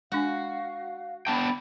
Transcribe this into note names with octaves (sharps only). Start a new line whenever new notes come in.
G#3 D4 F#4 F5 G#5
B3 D4 G5 A5 B5